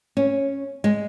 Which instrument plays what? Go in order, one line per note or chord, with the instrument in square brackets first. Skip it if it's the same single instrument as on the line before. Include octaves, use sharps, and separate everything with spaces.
[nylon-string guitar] C#4
G#3